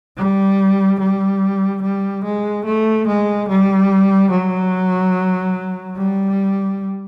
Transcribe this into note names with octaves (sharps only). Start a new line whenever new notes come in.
G3
G3
G3
G#3
A3
G#3
G3
F#3
G3